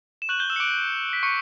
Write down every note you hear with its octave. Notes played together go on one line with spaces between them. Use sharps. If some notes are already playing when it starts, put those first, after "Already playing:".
E7
C#6 F#6 G6 F#7
G6 G7
E6 E7
C#7
D6 D7
B6
C#6 C#7